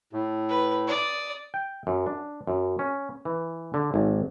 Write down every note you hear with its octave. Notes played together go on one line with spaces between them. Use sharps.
A2
B4
D5 D#6
G5
F#2
D4
F#2
C#4
E3
D3
G#1